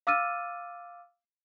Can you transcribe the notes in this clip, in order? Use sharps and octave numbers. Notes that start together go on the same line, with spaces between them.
F5 D6 E6 F6 A6 D#7